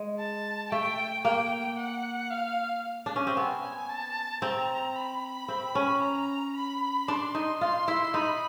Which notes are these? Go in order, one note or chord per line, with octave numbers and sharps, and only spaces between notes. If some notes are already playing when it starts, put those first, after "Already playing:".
Already playing: G#3
A5
A3 G5
A#3 G5
F#5
F5
D4
C#4
C4
B3 G#5
A5
C4 A#5
B5
C4
C#4
A#5
B5
D4 C6
D#4
F4 C6
E4
D#4 B5